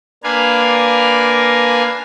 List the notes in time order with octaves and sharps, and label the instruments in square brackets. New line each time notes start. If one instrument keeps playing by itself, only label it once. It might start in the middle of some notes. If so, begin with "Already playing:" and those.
[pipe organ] A#3 D4 A#4 B4 F5 G#5